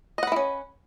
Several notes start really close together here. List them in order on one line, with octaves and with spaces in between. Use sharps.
D#5 F#5 B4 E4 C#4